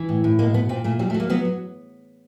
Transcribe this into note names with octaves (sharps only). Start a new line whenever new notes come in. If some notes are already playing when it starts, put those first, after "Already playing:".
Already playing: E3
A2
A2
B2 A#3
B2 B3
A#2 C4
A#2 A3
F#3 G3
A3
F#3
A#3
F#3 B3
F#3